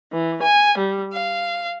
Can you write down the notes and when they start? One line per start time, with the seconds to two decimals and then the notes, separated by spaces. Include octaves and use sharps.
0.13 E3
0.42 G#5
0.77 G3
1.12 F5